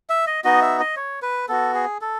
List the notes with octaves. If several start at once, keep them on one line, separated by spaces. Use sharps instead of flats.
E5
D#5
B3 D#4 F#4 D#5
E5
D#5
C#5
B4
B3 F#4 A4
G#4
A4